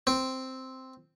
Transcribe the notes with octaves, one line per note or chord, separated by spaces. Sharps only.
C4